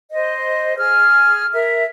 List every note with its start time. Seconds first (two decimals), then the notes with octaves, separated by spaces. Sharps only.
0.12 C5 D#5
0.77 G#4 F6
1.53 A#4 E5